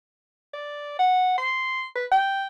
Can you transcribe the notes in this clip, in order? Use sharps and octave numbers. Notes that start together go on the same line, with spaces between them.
D5
F#5
C6
B4
G5